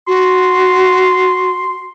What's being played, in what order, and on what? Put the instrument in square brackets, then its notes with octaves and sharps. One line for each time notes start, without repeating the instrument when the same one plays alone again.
[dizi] F#4 [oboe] C6